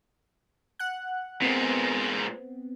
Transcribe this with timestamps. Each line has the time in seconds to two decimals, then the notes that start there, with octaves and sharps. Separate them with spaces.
0.79 F#5 F#6
1.42 A#2 G#3 B3 C4